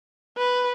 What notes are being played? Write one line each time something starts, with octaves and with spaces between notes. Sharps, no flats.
B4